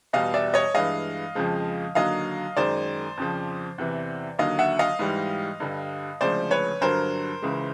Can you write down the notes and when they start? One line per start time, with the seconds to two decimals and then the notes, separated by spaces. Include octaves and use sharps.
0.13 E2 B2 G3 D#5 F5
0.34 D5 E5
0.54 C#5 D#5
0.74 G2 E3 G#3 D#5 F5
1.35 F2 C#3 F3 G#3
1.95 D#2 D3 F#3 D#5 F5
2.57 F#2 D#3 G#3 C5 D5
3.17 F2 C#3 F3
3.78 E2 C3 E3
4.39 D#2 D3 F#3 D#5 F5
4.59 E5 F#5
4.79 D#5 F5
4.99 G#2 E3 G3
5.60 G2 D3 G3
6.21 D2 C#3 F3 G#3 C5 D5
6.51 B4 C#5
6.81 G2 D3 F#3 A#4 C5
7.42 C#2 C#3 E3 G#3